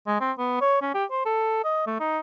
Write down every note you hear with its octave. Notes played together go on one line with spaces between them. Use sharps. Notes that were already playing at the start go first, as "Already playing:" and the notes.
G#3
C4
B3
C#5
C#4
G4
C5
A4
D#5
A3
D#4